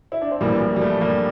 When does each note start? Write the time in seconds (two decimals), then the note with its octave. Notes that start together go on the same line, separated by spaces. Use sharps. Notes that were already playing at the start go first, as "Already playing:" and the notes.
0.12 E4
0.21 D4
0.31 C4
0.41 A#1 A2 E3 G3 A#3
0.60 G3
0.76 G3
0.81 A3
1.01 G3 A#3